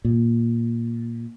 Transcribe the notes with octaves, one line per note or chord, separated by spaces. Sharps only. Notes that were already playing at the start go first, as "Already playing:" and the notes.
A#2